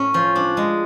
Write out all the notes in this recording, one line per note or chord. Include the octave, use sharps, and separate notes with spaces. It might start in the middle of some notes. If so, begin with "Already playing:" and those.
Already playing: A2 C#4
F3
D4
G#3